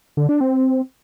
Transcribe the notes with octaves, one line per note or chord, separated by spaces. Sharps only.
D3
D4
C4